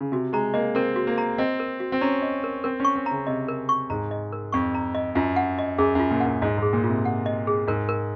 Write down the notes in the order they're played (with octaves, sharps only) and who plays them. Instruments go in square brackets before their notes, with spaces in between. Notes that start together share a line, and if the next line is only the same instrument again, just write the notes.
[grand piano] C#3
[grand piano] C3 [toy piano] F#4
[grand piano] G#3 [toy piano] A#5
[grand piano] A#3 [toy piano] D#5
[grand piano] C4 [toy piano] A#4
[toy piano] F#4
[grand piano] A#3
[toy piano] A#5
[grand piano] C4 [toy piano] D#5
[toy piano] A#4
F#4
[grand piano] C4
[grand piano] C#4 [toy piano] A#5
[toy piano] D#5
A#4
[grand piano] C4 [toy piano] A#4
[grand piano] C#4 [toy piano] C#6
[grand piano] C4
[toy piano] A#5
[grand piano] C#3
[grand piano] C3 [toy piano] D#5
[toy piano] A#4
C#6
[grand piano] G#2 [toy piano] A#5
[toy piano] D#5
A#4
[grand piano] F2 [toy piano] C#6
[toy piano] A#5
D#5
[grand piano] F#2 [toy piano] F4
[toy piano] F#5
D#5
[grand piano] F#2 [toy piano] G#4
[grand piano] F#2 [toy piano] F4
[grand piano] A#2
[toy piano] F#5
[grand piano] F#2
[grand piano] G#2 [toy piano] D#5
[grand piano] G#2 [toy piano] G#4
[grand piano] A#2
[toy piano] F4
[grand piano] C3
[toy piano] F#5
D#5
G#4
[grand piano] G#2 [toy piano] A#4
[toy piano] A#4